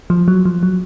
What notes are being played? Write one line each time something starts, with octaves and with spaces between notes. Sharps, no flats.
F3
F#3
F3
F#3